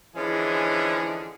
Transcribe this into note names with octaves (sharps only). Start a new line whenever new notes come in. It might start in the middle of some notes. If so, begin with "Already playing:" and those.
D3 E3 F3 G#3 C#4 G#4